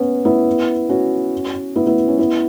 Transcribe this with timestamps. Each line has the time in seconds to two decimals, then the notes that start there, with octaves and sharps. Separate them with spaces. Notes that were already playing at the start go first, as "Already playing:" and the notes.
Already playing: B3 C#4
0.25 B3 E4
0.89 C#4 F#4
1.76 B3 E4
1.87 B3 E4
2.08 C#4
2.18 B3 E4